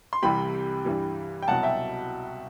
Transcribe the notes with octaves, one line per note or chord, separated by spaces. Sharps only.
C6
C2 C3 E3 G3 G5 B5
G2 E3 G3
G5
C2 B2 F#3 F#5 A5
E5 G5